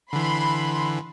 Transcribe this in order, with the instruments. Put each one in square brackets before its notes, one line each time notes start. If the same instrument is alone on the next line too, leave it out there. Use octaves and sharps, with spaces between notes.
[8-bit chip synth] D3 E3 [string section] B5 C6